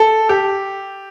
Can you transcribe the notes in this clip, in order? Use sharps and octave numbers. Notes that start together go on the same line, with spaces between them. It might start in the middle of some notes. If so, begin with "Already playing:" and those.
Already playing: A4
G4